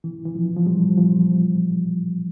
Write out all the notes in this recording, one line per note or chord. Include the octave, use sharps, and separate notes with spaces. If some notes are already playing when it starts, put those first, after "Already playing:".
E3
E3
F3
F3
G3
F3